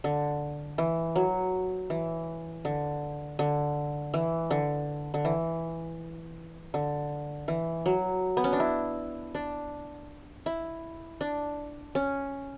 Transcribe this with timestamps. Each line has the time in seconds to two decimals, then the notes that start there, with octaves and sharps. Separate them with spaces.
0.04 D3
0.78 E3
1.16 F#3
1.90 E3
2.65 D3
3.39 D3
4.14 E3
4.51 D3
5.14 D3
5.25 E3
6.74 D3
7.48 E3
7.86 F#3
8.37 B3
8.44 C#4
8.53 D4
8.60 E4
9.35 D4
10.46 E4
11.21 D4
11.95 C#4